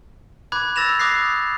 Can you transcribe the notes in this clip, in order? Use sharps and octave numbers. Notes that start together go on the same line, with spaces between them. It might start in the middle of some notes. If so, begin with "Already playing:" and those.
B5 D6 F#6 G#6
E6 A6 A#6 E7 F7
D6 D#6 F#6 A#6 C7